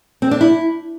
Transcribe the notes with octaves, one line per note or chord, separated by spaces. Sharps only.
C4
D4
E4